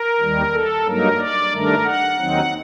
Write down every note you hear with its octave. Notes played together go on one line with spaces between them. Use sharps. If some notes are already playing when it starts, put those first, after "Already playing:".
Already playing: A#4
D#2 D#3 G3
A4
G2 F#3 A#3 D#4 A#4
D5
G2 D#3 A3 D4 A#4
F#5
D#2 D#3 F#3 C4 D#4